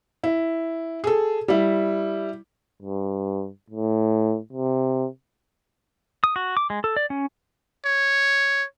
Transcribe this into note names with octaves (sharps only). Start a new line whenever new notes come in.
E4
G#4 A4
G3 E4
G2
A2
C3
D#6
F#4
D6
G#3
A4
D5
C#4
C#5